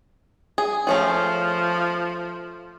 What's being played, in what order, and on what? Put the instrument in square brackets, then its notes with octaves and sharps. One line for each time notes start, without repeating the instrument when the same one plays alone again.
[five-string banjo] G#4
[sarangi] F3 [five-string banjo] A3 C#4 G#4